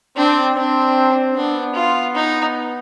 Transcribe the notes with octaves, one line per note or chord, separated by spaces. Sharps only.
C4 D4
C4 D4
B3 D4
F4
D#4